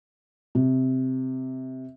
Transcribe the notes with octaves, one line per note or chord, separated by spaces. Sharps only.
C3